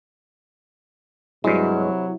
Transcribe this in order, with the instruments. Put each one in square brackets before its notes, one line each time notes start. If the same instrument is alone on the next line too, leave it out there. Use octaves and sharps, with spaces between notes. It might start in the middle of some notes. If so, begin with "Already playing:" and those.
[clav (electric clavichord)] G2 G#3 [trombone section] C3 F#3 [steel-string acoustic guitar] E4